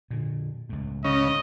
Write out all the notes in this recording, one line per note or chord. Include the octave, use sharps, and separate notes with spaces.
A#2 D3
C#2 A2
C#3 D#5